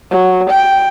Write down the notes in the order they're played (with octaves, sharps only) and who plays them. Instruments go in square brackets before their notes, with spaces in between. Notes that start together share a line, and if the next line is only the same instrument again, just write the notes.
[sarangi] F#3
G5